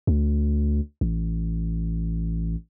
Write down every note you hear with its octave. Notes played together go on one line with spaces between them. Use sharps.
D2
A1